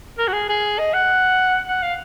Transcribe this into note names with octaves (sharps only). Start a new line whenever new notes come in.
A#4
F#4
G#4
G#4
D#5
F#5
F#5
F5